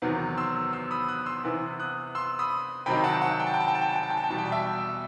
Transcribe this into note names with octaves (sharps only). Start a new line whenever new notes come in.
E2 C3 D#3 F#3 B3
C6 E6
C6 E6
B5 D#6
D#6 F#6
C6 E6
C3 E3 B3 E4
D#6 F#6
C6 E6
B5 D#6
C3 D#3 F#3 C4 D#4 G5 B5
F#5 A5
F#5 A5
G5
A5
G5
A5
G5
A5
G5
A5
G5
A5
G5
A5
G5
E2 B2 G3 A5
G5
A5
E5 G5